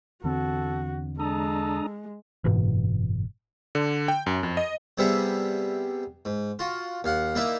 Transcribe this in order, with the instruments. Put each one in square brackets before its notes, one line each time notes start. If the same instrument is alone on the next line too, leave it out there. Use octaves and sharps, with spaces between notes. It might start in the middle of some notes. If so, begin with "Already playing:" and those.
[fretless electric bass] E2 D3 C4 [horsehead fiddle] F#4 [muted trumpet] A4
[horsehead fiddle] G#3 [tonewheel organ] D4 A#5 D#6 [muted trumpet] A4
[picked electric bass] F#1 G#2 B2 E3
[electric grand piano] D3
G5
F#2
F2
D#5
[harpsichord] C3 G3 B3 G#4 E5
G#2
F4 F#4
D#2 F5 F#5
A#3 D#4 E4 D5 E5